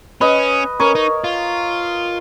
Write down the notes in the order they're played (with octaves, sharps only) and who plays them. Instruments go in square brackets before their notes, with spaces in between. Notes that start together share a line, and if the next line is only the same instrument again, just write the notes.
[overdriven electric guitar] C#4 [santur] B4 D#5
[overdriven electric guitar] C#4 [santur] A#4 C#5
[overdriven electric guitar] D#4
F4